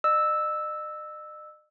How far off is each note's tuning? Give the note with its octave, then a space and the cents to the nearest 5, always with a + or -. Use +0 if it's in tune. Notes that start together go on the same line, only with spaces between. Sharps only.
D#5 -40 E6 -5